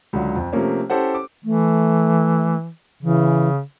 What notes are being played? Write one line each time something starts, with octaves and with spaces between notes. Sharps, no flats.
C#2 D3 F#3
F2
C3 F3 A3 A#3 C#4
C#4 E4 G4 A4 C5 F#5
D6
E3 A3
C#3 E3